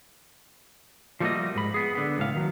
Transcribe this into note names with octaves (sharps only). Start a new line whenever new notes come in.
F3 G3 A3 A#3 F#4 D#5
G#2 B5
B3 G#4
D3 B3
C#2 A2 F5
D#3 F#3